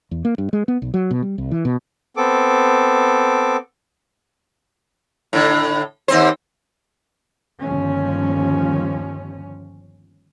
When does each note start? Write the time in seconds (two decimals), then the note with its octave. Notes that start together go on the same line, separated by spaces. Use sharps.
0.11 E2
0.25 A#3
0.38 G2
0.53 G#3
0.68 B3
0.82 B1
0.94 F#3
1.11 B2
1.22 G3
1.38 C2
1.51 E3
1.65 B2
2.17 B3 C4 A4 D6
5.33 A2 D3
6.08 D#2 C4 C5
7.62 G1 D#2 F3 C#4